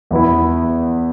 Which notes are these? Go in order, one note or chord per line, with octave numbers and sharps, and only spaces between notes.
E2 E3 B3 E4